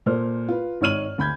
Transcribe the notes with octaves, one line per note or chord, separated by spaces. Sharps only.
A#2 A4 C5 F6
F4 B4
G#1 D#4 C#5 F6 D#7 F#7
D2 B5 G6 G#6